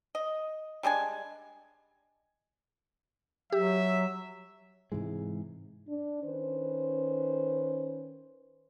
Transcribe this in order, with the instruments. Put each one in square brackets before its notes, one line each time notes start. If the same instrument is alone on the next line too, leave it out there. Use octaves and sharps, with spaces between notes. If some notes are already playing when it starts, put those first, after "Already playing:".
[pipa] D#5
G3 G#3 D4 G#5
[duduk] F#3 [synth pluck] G4 [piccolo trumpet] E5
[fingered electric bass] G#2 C3 E3 G#3
[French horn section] D4
D#3 C#4 B4 C5